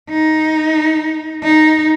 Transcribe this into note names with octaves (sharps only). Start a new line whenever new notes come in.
D#4
D#4